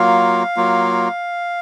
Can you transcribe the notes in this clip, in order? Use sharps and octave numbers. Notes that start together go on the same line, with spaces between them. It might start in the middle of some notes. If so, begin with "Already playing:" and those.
Already playing: F#3 A#3 F4 F5
F#3 A#3 F4